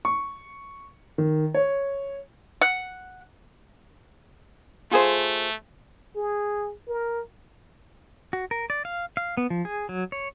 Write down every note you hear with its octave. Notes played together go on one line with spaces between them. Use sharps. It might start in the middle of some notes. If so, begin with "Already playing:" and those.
C#6
D#3
C#5
F#5
A3 F4 G#4 C5
G#4
A#4
F#4
A#4
D5
F5
F5
B3
F3
G#4
F#3
C#5